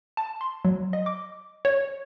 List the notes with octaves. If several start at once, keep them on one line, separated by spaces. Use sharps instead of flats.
A5
C6
F#3
D#5
D6
C#5